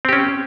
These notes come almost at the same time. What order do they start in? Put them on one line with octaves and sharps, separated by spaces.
C4 G4 C#4